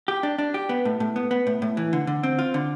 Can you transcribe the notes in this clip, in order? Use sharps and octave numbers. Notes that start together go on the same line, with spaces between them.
G4
D4
D4
G4
B3
A2
A2
B3
B3
A2
A2
E3
D3
D3
C4
F4
D3